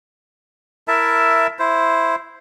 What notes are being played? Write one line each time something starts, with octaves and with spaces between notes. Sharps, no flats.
E4 A#4 E5 A5
E4 C5